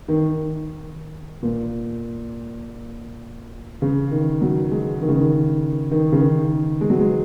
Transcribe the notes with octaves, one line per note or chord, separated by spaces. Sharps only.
D#3
A#2
C#3
D#3
F#3
G#3
D#3
C#3
D#3
D#3
C#3
D#3
G#3
F#3
G#3